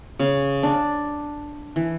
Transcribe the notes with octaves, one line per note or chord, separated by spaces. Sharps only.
C#3
D4
E3